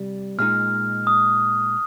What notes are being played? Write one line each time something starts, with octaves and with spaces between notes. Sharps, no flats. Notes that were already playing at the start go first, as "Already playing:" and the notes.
Already playing: C3 G3
A#2 G#3 D#4 F6
D#6